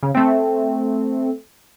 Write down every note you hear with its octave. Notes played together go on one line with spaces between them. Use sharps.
C#3
A3 C4